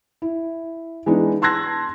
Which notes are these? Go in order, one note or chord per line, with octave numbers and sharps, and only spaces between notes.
E4
E3 G#3 B3 D4 D#4
A5 C6 E6 F#6 G#6 A#6